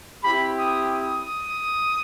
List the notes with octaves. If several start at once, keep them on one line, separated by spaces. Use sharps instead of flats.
C4 E4 G4 B5
D#6
D#6